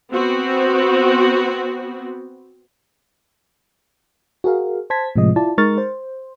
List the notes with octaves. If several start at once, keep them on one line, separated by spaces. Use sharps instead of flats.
B3 C4 F#4
F#4 G#4 A#4 F5
C5 A5 G#6 B6
A2 C3 F3 G#3 D#5
E4 F4 D5 A5
G#3 D#4 A#4 C#6 F6 A6
C5